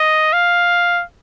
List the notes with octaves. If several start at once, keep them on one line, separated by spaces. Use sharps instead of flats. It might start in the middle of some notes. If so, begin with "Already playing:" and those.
Already playing: D#5
F5